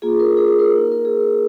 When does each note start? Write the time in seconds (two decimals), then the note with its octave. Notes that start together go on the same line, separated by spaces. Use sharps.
0.02 A#3 F4 G#4
0.20 A#4
0.37 G#4
0.48 G#4
0.59 A#4
0.70 A#3
0.75 D#4
0.92 A#4
1.05 G#4